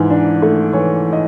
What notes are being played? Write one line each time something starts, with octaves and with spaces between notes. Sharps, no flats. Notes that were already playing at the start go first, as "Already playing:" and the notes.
Already playing: G#2 E3
D4
A3
E3 C#5
D#5